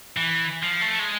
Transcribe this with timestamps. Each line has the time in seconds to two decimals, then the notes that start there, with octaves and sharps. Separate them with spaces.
0.17 E3
0.63 F3
0.81 A3
0.99 G#3